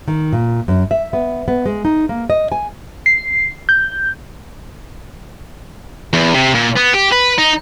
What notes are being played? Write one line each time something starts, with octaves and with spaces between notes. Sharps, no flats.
D#3
A#2
F#2
E5
B3
B3
G#3
D#4
A#3
D#5
G#5
C7
G6
E2
C3
A#2
B3
G4
B4
D#4